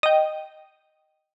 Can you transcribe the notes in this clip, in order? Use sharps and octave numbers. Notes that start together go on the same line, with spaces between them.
D#5 G5